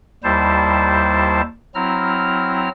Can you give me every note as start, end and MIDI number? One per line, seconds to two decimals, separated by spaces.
0.24 1.41 39
0.24 1.41 55
0.24 1.41 64
0.24 1.41 72
0.24 1.41 81
1.75 2.69 54
1.75 2.69 60
1.75 2.69 64
1.75 2.69 82
1.75 2.69 89